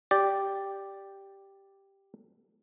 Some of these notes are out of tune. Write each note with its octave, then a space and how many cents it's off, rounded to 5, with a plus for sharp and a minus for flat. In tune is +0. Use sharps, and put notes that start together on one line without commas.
G4 +0 D5 +0